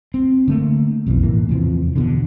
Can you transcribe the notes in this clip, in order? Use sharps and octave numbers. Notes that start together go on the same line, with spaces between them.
C4
D3 A3 A#3
B1 F2 B2 E3
A2 E3 A#3
E2 C3 E3 F3
E2 B2 D3